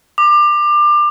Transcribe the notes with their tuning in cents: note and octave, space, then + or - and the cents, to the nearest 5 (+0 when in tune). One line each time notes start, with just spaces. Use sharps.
D6 +25